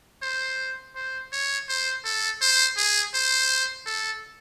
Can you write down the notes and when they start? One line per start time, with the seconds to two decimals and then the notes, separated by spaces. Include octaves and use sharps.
0.22 C5
0.95 C5
1.32 C#5
1.69 C5
2.05 A4
2.42 C5
2.77 G#4
3.14 C5
3.86 A4